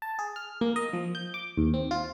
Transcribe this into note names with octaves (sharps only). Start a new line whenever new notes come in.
A5
G#4
F6
A#3
D#5
F3
G6
D6
D#2
C4
F4